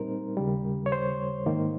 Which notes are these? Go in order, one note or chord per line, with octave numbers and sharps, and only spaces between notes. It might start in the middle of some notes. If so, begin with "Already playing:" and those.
Already playing: A#2 G3 C4 D#4 A#4 C5
D#2 C#3 G3
C#5
C5
G#2 D#3 A#3